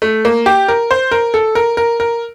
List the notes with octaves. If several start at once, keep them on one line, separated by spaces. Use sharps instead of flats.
A3
A#3
G4
A#4
C5
A#4
A4
A#4
A#4
A#4